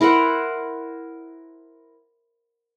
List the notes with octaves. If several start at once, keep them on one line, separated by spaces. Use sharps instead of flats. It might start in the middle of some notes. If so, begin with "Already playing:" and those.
E4 A#4 C5 F#5